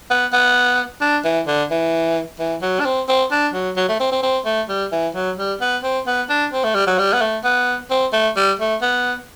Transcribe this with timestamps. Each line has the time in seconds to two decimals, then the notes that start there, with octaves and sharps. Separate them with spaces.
0.10 B3
0.33 B3
1.01 D4
1.24 E3
1.47 D3
1.71 E3
2.39 E3
2.62 F#3
2.80 D4
2.85 C4
3.08 C4
3.31 D4
3.54 F#3
3.77 F#3
3.88 A3
4.00 C4
4.12 C4
4.23 C4
4.45 A3
4.69 G3
4.92 E3
5.15 F#3
5.37 G3
5.61 B3
5.83 C4
6.07 B3
6.30 D4
6.53 C4
6.64 A3
6.75 G3
6.87 F#3
6.99 G3
7.13 B3
7.21 A3
7.44 B3
7.90 C4
8.13 A3
8.36 G3
8.59 A3
8.82 B3